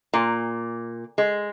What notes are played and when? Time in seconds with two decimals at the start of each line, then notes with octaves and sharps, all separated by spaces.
0.13 A#2
1.18 G#3